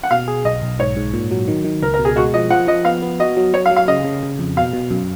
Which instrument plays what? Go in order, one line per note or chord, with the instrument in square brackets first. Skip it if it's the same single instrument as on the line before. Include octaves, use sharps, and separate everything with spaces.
[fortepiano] F#5
[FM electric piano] B2 [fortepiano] F5
[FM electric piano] G#4
[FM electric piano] B1 [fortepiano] D#5
[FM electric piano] B1
[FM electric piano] G#2 [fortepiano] C#5
[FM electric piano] G#2
A#2
F#3
D#3
D#3
[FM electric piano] C#2 [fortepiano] A#4
[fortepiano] A#4
[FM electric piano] B2
[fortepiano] G#4
[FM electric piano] G#3 [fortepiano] F#4
[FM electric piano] F3 [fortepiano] D#5
[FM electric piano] F3 [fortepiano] F#5
[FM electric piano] F3 [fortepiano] D#5
[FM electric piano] B3 [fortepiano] F5
[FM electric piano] B3
[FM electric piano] F#4 [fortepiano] D#5
[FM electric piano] F#3
[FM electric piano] F#3 [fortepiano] C#5
[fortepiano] F5
[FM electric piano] F#3
[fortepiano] F5
[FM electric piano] C#3 [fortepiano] D#5
[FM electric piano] C#3
C#3
F2
[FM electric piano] B2 [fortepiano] F5
[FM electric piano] B2
F#2